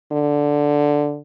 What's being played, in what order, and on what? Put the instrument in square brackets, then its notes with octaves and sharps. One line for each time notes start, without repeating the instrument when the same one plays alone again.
[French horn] D3